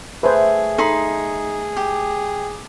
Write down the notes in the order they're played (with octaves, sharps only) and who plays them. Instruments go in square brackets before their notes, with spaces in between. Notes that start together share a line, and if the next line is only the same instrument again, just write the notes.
[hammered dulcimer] A3 [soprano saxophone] G#4 [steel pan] B4 C5
[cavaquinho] D#4 B5 C6 [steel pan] A4
[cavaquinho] G4